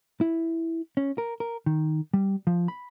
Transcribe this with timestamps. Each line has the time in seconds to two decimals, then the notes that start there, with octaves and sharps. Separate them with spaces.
0.21 E4
0.97 C#4
1.18 A#4
1.40 A#4
1.66 D#3
2.14 G3
2.47 F3
2.68 B5